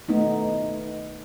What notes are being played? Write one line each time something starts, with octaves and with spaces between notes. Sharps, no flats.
A3 B3 D#4